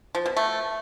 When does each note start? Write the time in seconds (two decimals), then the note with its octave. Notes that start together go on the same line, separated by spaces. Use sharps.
0.15 F3
0.26 B2
0.37 A3